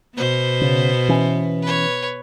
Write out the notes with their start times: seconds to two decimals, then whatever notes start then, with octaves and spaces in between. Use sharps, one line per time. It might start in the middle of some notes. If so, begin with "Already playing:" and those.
0.17 B2 B3 C5
0.61 C#3
1.09 E3 C#4
1.62 B4 C#5